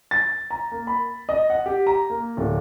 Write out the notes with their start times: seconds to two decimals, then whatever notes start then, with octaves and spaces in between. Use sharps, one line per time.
0.11 A6
0.51 A#5
0.72 A#3
0.87 B5
1.29 D#5
1.50 F#5
1.66 G4
1.87 A#5
2.10 A#3
2.37 D1